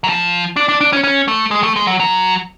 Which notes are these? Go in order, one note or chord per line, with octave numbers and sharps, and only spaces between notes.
F#3
F3
D4
D4
D4
C#4
C#4
A3
G#3
A3
G#3
F#3
F#3